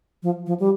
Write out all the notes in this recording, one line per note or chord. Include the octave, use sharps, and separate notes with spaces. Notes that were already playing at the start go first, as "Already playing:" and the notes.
F3
F3
G3